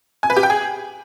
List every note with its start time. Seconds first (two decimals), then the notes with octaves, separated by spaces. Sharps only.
0.23 G#5
0.30 B4
0.36 G4
0.43 G5
0.50 G#4